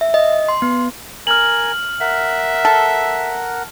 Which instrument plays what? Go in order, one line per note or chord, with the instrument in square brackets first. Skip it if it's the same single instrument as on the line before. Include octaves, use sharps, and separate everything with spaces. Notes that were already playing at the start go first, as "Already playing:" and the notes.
[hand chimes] E5
D#5
C6
B3
[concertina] A#4 G#5 [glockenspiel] F6 F#7
[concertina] A#4 F#5 [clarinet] E5
[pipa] A4